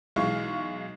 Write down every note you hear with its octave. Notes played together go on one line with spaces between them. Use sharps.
B1 E3 G#3 F5 C#6